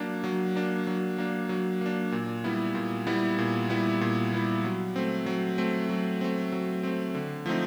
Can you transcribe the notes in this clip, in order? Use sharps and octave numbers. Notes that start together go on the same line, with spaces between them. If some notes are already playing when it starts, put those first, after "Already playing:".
Already playing: F#3 A#3 D4
F#3
A#3 D4
F#3
A#3 D4
F#3
A#3 D4
A#2
G3 B3 E4
A#2
G3 B3 E4
A#2
G3 B3 E4
A#2
G3 B3 E4
F#3
A3 C4
F#3
A3 C4
F#3
A3 C4
F#3
A3 C4
D3
F3 A3 C4 D#4